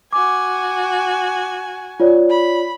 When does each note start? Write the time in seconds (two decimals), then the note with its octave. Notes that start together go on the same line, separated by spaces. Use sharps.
0.13 F#4 G#5 D6
2.00 F4 C#5 D5
2.30 B5